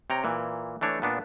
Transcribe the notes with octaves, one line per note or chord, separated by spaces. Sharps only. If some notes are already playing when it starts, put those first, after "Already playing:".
C3 C#5 G5 A#5
A#2 E3
E3 A3 D4 C#5
A#2 B3 D4